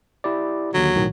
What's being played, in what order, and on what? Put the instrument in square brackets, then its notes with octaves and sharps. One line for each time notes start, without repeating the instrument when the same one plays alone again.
[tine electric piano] E4 G4 D5
[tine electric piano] D#2 D3 [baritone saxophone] F#3
[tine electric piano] B1 A2 D#3